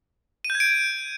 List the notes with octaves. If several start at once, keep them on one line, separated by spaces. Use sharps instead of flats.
D#7
G6
G#6
D7